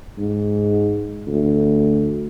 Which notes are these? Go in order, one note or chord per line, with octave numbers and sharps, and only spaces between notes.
G#2
D2